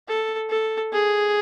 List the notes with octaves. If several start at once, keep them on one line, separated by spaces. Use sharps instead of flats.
A4
A4
G#4